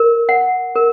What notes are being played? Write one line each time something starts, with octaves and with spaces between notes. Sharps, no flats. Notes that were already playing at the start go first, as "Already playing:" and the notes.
Already playing: A#4
F#5
A#4